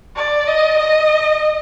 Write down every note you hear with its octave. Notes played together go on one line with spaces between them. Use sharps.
D5
D#5
D#5